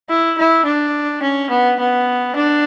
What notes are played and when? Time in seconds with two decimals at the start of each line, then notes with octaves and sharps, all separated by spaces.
0.09 E4
0.38 E4
0.65 D4
1.23 C#4
1.50 B3
1.80 B3
2.36 D4